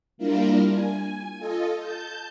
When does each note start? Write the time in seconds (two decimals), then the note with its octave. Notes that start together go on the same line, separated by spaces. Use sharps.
0.18 G3 A#3 D4 E4 F4 A#4
0.73 G#5
1.38 F4 A4 D#5
1.79 A5 G6